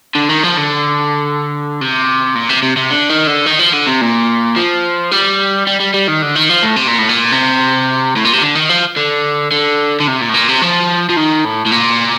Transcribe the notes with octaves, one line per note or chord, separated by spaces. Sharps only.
D3
D#3
F3
D3
C3
A#2
C3
C3
C3
D3
D#3
D3
D#3
F3
D3
C3
A#2
F3
G3
G3
G3
G3
D#3
D3
D#3
F3
A2
C3
A#2
A2
A#2
C3
A2
A#2
C3
D3
D#3
F3
D3
D3
D3
C3
A#2
A2
A#2
C3
F3
F3
D#3
A2
A2
A#2